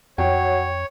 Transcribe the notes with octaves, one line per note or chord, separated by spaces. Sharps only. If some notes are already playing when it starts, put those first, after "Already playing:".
F2 F#3 C#5 G5